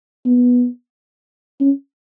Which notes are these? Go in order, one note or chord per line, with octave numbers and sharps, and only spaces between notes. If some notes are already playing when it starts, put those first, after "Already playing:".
B3
C#4